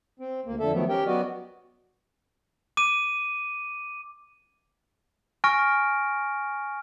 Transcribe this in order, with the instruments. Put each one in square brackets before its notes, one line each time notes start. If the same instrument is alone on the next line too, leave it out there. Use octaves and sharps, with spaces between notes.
[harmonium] C4
D2 A#3
F2 D3 A4 E5
D#3 F3 F#3 A3 B3
C#4 G4 A#4 G5
F#3 B3 F#4 D5 D#5
[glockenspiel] D6 D#7
G#5 C#6 F6 A#6 D7